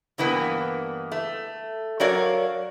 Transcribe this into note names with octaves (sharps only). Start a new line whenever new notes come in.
G2 E3 A#3 B3
A3
F#3 F#4 A#4 C#5 D5 F5